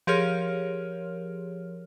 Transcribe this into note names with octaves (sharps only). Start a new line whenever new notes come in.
F3 G4 G#4 A#4 C#5 F6